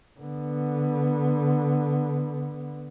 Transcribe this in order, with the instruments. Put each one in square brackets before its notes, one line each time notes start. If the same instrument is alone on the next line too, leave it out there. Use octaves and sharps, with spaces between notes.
[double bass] D3 B3